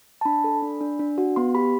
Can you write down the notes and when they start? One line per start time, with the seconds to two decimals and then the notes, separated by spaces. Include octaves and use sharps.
0.21 A5
0.25 D4 B5
0.44 A4
0.62 D4
0.81 D4
0.99 D4
1.18 F#4
1.36 B3 C6
1.55 G4 B5